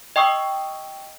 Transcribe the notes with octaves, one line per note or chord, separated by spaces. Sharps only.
D#5 G5 C#6 D#6 E6